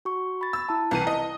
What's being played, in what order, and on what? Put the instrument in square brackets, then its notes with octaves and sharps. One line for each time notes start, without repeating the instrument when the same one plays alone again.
[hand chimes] F#4 C#6
B5 A6
[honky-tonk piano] E6
[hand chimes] E4 A5
[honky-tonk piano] C2 E3 D#7
D#5